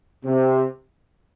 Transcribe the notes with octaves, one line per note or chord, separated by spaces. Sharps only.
C3